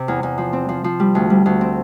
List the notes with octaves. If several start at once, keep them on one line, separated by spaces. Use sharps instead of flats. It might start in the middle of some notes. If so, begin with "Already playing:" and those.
Already playing: C3
E2
E2
F3
C4
F3
F3
G3
D2
G3
D2
C4